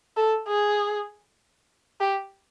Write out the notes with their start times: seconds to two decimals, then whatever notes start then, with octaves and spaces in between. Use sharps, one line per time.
0.17 A4
0.48 G#4
2.00 G4